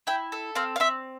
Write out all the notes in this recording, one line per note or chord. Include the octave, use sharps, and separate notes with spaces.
E4 G5
A4
C4 F5
F5
C4 E5